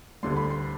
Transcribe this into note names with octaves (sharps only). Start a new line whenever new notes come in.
D2 D3 G3 C6
B5
C6